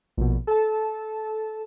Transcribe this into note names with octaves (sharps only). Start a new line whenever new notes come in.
A#1 B2
A4 A5